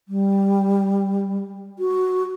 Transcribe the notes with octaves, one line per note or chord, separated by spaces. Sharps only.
G3
F#4